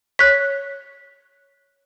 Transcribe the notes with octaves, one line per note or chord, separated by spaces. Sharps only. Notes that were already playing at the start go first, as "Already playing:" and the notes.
C#5 F#6 B6